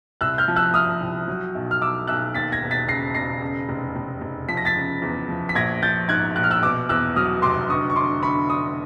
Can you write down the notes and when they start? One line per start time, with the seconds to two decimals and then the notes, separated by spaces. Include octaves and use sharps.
0.21 C2 E6 F#6
0.38 F6 G6
0.48 F3
0.56 E6 F#6
0.74 F3 D#6 F6
1.01 C2
1.28 F#3
1.55 B1
1.71 F6
1.81 B1 D6 E6
2.07 B1 E6 F#6
2.34 D#2 A6 B6
2.52 G#6 A#6
2.62 E1
2.71 A6 B6
2.88 C#3 A#6 C7
3.14 E1 A#6 C7
3.42 C#3
3.69 F1
3.96 F1
4.21 F1
4.49 F3 B6
4.57 A#6
4.65 A6 B6
4.75 C#3
5.02 E2
5.29 F3
5.49 B6
5.55 A#1 G#6 A#6
5.82 F3 G6 A6
6.09 G#2 F#6 G#6
6.36 A#1 F#6
6.44 F6
6.51 E6 F#6
6.63 B2 D6 E6
6.89 E2 E6 F#6
7.16 F#3 D#6 F6
7.42 F1 C6 D6
7.69 D3 C#6 D#6
7.90 C#6
7.96 D3 C6 D6
8.23 D3 B5 C#6
8.49 D3 C#6 D#6